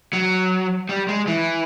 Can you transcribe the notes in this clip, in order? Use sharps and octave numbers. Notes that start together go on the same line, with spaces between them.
F#3
G3
G#3
E3